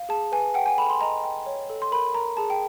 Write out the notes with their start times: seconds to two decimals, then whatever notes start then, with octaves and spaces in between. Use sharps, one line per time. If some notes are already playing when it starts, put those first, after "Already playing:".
Already playing: F5
0.09 G#4 A5
0.32 B4 G#5
0.54 F#5 G5
0.66 G#5
0.78 A4 B5
0.90 C6
1.01 D#5 A#5
1.24 G5
1.46 C#5
1.70 A4
1.82 C6
1.91 A#4 B5
2.15 A#4 A#5
2.37 G#4 A5
2.50 G5